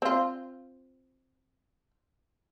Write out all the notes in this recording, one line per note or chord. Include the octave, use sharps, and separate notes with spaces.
C4 F4